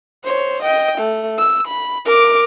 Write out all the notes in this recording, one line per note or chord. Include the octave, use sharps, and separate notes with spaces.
C5 C#5
D#5 G5
A3
E6
B5
A#4 D6